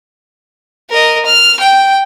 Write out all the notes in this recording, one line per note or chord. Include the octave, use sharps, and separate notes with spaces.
A#4 D#5
F6
G5